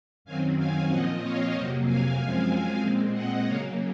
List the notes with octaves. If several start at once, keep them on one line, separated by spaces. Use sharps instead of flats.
F#2 D#3 F#3 C4 F5 G#5
F5 G#5
A#2 F3 C4 D#5 F#5
C#5 F5
F2 C3 F#3 A#3 C5 D#5
F5 G#5
F#2 F3 G#3 C4 F5 G#5
A#2 G#3 C4
D#5 F#5
C#3 F#3 A#3 C#5 F5